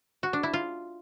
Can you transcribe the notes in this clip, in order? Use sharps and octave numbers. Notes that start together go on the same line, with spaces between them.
F#4
D4
E4
F4